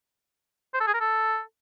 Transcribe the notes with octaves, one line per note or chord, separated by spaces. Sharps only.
C5
A4
G#4
A#4
A4